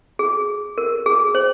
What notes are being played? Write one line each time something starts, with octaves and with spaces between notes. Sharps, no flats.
G#4
A#4
G#4
C5